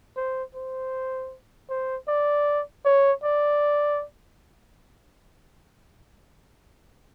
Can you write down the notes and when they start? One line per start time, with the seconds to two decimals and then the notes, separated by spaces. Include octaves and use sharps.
0.16 C5
0.55 C5
1.69 C5
2.08 D5
2.85 C#5
3.24 D5